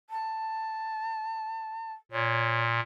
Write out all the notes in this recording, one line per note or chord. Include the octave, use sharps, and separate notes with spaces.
A5
A#2 C#5